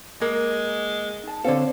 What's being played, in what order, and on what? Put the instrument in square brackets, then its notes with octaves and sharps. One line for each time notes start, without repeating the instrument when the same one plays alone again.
[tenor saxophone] G#3 [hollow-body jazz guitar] A#3 [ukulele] A#4
[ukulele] D#4 A5
[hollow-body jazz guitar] D3 A4 [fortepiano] C4 [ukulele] C#5 D5 F5